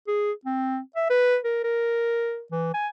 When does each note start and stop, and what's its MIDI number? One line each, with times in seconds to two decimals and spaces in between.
0.08 0.32 68
0.45 0.78 60
0.96 1.10 76
1.10 1.38 71
1.45 1.60 70
1.64 2.42 70
2.52 2.74 52
2.74 2.88 80